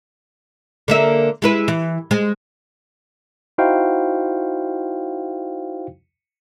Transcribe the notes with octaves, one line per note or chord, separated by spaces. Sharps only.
D3 A#3 E5
G#3 E4 B4
E3
G#3 C5
D#4 E4 F#4 C5 F5 G5